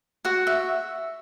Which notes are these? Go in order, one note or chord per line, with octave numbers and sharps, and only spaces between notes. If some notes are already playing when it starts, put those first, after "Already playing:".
F#4 F#5
E5